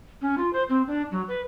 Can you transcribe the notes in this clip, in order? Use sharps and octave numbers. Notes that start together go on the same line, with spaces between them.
C#4
F4
C5
C4
D4
F#3
B4